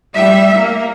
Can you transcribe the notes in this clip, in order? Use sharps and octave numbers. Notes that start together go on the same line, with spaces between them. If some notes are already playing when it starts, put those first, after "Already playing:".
G3 E5
A#3